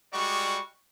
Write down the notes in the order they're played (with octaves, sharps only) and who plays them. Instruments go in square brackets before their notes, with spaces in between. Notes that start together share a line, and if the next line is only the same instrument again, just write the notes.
[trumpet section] G3 G#3 F#4 D5 C#6